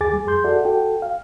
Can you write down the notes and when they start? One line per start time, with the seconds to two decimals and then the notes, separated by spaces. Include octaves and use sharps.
0.01 D#2 G#4 G#5 D6 A6
0.13 G3
0.27 F2 G#4 C6 G6
0.44 F#4 A4 D5 E5 F#5
0.65 F#4 A4 G5
1.02 F5